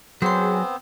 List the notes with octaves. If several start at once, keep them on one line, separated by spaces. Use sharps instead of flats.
F#3 B3 C4 G#4 C5 C#5 C6